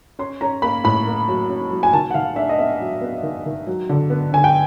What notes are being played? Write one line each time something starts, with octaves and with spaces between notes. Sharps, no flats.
C#4 C6
C#4 A#5
A#3 B5
A2 B5
A#3
F#3
C#4
F#3
G#5
D#3 A5
F#5
D#3 F5
D4 E5
D#5
B3 E5
F#3
B3
D#3
D#3
F#3
D3
B3
D3 G#5
G5